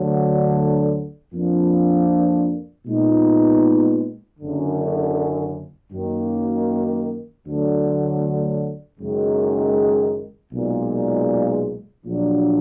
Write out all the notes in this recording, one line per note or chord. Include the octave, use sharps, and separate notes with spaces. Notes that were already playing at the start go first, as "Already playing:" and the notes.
Already playing: D2 D3 F#3
F2 F3 A#3 D4
A#2 G#3 B3 D#4
F#1 F#2 D3
F#2 D#3 A#3
D2 D3 F#3
F#1 F#2 D#3 G#3
B1 A#2 G#3
A#1 A#2 F#3 D4